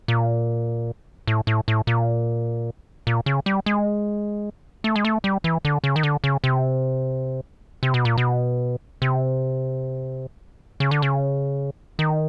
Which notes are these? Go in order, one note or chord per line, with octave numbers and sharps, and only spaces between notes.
A#2
A2
A2
A2
A#2
A#2
C#3
G3
G#3
A3
G#3
A3
G3
E3
D3
C#3
D#3
D3
C#3
C3
C3
B2
A#2
B2
C3
C#3
D3
C#3
D#3